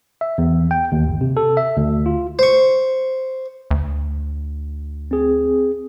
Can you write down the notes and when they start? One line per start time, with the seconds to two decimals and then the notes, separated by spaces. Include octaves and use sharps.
0.21 E5
0.38 E2
0.71 G5
0.92 D#2
1.08 G1
1.21 C3
1.37 A4
1.57 E5
1.77 D2
2.06 F4
2.39 C5 C#6
3.71 D2
5.11 C4 G#4